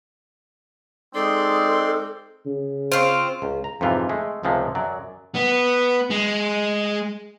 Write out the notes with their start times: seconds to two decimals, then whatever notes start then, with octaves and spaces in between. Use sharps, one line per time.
1.15 G#3 C4 D#4 A4 D5 C6
2.46 C#3
2.92 C4 F4 C5 C#6
3.42 C#2
3.64 A#5
3.81 F2 G#2 C3 E3 F4
4.09 G#3 A3
4.43 C#2 C3 F3 G#3 A3
4.75 F#2 F#3 D5
5.35 B3
6.11 G#3